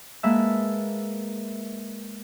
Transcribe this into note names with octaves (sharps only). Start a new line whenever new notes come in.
G#3 A#3 B4 E5 A5 E6